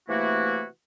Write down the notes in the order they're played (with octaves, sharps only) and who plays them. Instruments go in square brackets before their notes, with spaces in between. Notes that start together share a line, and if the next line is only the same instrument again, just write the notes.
[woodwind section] C3 E3 A3 A#3 E4 F#4